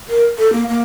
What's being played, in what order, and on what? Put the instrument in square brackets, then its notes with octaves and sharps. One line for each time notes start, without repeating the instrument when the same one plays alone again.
[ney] A#4
A4
A#3
A#3